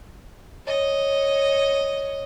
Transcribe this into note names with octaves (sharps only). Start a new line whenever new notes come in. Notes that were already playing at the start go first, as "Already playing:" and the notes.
C#5 D#5